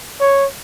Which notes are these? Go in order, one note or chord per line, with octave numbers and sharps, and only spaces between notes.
C#5